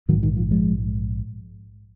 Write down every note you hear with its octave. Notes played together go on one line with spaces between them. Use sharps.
A#1 G#2 D#3 F#3
D#3
F3
F3 G#3